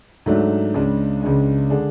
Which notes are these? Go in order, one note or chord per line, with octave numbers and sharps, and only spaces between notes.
G#2 F#3 A3 D4
C#2 C#3 G#3 D4
C#2 C#3 G#3 D4
D3 G#3 D4 G#4